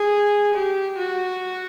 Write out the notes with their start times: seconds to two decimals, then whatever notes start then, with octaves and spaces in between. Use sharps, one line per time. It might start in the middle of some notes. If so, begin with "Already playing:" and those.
Already playing: G#4
0.54 G4
0.98 F#4